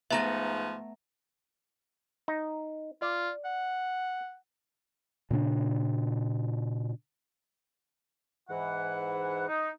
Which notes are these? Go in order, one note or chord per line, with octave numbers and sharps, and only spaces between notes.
G#2 F3 A3 B3 B4 E5 A#5 A#6
D#4
F4 D5
F#5
A#2 C#3 C4 D4
G#2 E3 F#5
D#4